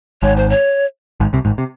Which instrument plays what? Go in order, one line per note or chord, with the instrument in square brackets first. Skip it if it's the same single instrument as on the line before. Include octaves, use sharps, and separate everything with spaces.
[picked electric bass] G#1 G#2 [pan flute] C#5
[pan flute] C5
C#5
[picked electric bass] G#1 G#2
C2 C3
G#1 G#2
C3